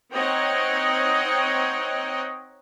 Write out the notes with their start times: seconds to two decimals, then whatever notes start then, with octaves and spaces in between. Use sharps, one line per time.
0.12 C4 D#4 C#5 D#5 F#5 G5